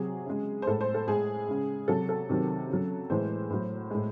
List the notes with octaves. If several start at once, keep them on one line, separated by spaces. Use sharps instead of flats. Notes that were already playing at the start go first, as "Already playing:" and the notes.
Already playing: C3 F#3 G#4
C#3 G#3
C5
A2 G#3 A4
C5
A4
A2 G#3 G#4
C#3 G#3
C3 F#3 A4
A4
C3 D#3 F#3
C#3 F#3
A2 E3 G#3 C5
A2 F#3
A2 G#3